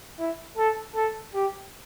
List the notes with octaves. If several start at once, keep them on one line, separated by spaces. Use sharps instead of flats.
E4
A4
A4
G4